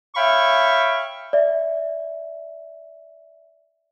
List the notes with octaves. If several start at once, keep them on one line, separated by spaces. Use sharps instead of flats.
C#5 E5 F5 G5 B5 C#6
D5 E5